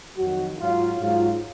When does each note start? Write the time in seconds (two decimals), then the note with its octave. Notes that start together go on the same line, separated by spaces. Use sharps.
0.17 F2 D#3 F#3 F#4
0.58 G#2 F#3 F4
0.98 G#2 F#3 F4